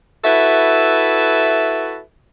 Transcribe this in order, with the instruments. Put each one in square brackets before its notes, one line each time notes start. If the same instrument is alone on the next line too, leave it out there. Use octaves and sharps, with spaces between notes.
[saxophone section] E4 F#4 A4 B4 E5